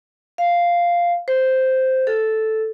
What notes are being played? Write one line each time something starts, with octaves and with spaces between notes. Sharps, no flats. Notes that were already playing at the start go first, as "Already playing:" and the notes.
F5
C5
A4